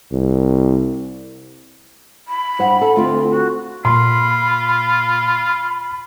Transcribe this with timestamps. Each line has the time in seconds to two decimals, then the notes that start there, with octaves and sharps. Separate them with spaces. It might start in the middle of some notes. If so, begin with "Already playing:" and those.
0.12 C2
2.28 B5
2.59 G2 C5 F#5
2.81 A4
2.96 D2 A3 C4 F4
3.30 F#4
3.85 A#2 F4 B5 C6